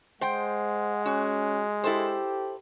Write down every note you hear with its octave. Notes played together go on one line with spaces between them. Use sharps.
G#3 C5 F#5 G5
C#4 F#4
E4 G4 A4 C5